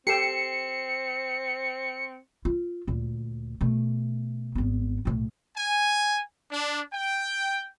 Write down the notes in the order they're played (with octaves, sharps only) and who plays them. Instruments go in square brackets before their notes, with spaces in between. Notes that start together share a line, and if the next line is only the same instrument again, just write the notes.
[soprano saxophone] C4 [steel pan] G4 A4 G5 [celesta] C7 E7 [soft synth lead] C#7
[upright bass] F4
D2 A#2
B2 A3
G#1 B3
B1 A2
[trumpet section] G#5
D4
G5